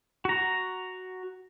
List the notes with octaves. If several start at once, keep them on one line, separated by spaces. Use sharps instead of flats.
F#4 A#5